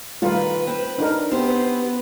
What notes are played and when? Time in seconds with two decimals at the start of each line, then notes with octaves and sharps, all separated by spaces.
0.22 D#3 G3 A3 F4 B4
0.67 C4
0.98 D4 D#4 A#4
1.31 B3 C4 G4 C5